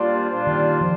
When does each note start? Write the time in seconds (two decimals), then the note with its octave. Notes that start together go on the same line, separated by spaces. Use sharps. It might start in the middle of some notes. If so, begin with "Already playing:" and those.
Already playing: A#2 G3 D4 F4 C5
0.30 A#2 G3 D4 F4 C5
0.47 D#3
0.81 F3 C5